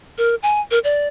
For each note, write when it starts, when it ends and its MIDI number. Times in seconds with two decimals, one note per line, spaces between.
0.18 0.35 70
0.43 0.61 80
0.71 0.79 70
0.84 1.08 74